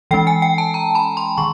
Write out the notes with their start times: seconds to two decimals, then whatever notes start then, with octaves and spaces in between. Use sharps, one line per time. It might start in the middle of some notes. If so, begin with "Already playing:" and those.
0.11 E3 G#3 C#4 G5
0.27 G#5
0.42 G5
0.58 A5
0.74 A#5
0.95 B5
1.17 C6
1.38 D#3 C#6